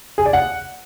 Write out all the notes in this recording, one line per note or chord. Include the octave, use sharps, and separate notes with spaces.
G#4
D5
F#5